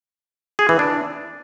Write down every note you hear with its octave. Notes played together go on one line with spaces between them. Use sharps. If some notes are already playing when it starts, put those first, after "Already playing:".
G#4
E3
D4